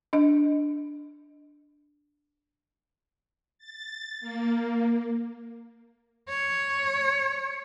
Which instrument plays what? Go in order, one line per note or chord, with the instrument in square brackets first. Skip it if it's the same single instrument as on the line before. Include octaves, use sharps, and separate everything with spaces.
[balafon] D4 D#5
[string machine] A6
A#3
[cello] C#5